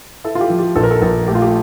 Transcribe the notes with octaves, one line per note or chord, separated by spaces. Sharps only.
E4 A4
F4
G4
F3
G4
A#1 A4
A#4
A4
A#1 A4
A3 G4
F4
G4